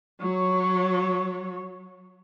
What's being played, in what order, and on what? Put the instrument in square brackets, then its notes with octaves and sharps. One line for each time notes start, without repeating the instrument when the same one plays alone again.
[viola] F#3 C#5